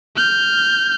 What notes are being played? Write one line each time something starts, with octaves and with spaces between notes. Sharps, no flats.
F6 G6